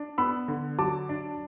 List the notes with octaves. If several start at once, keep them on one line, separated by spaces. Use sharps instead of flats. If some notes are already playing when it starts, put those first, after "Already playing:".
Already playing: D4
B3 B5 E6
D3
F#3 A5 D6
D4